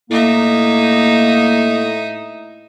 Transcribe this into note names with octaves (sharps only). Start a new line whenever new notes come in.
A2 A#3 D#4 E5